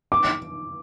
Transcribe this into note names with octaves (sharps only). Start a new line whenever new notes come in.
D6